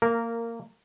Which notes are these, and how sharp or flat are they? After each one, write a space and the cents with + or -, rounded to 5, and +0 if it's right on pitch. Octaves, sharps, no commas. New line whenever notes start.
A#3 -15 A#4 -5